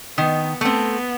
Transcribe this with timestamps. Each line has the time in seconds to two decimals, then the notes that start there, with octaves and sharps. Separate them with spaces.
0.17 D#3 B3
0.61 A3 B3 C4